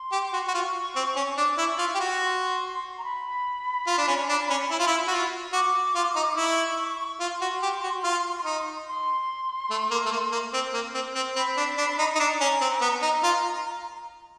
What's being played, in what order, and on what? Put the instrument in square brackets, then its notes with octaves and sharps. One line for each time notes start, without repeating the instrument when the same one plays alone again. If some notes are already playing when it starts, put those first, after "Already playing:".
Already playing: [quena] C6
[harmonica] G4
F#4
F#4
[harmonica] F4 [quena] C#6
[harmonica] C4
C#4
[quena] C#6
[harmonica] D4 [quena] D6
[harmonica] E4 [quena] C#6
[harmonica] F4 [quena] C#6
[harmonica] G4
[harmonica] F#4 [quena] C#6
[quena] C6
A#5
B5
[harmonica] F4
D4
C#4
D4
C#4
E4
F4
E4
F#4
F4
[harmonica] F#4 [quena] D6
[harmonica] F4
D#4
[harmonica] E4 [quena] C#6
[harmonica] F4 [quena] C6
[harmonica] F#4
G4
F#4
F4
D#4
[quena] C6
[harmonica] A3
A#3
A3
A#3
A#3
C4
A#3
C4
C4
[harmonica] C4 [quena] B5
[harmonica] D4
D4
D#4
D#4
[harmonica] D4 [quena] A#5
[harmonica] C#4
C4
B3
[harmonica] D#4 [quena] A#5
[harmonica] F4